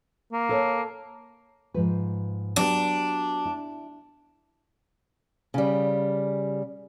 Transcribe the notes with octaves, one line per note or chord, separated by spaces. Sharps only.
A#3
A4 C#5 A5
G#2 F3 B4
F#3 B3 D4 G4
E4
C#3 G3